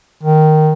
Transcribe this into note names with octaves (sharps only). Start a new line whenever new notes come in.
D#3